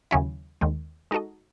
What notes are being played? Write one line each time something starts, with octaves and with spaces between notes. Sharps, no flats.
D#2 C#3 F#3 C#4 E4
D#2 D#3 G#3
G#3 D#4 F#4 A4 D#5